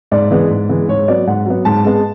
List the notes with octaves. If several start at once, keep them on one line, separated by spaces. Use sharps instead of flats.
G#2 D5
E3 G#3 B3
G#2
E3 G#3 B3
G#2 C#5
F#3 B3 D5
G#2 F#5
F#3 B3
G#2 A5
G#3 B3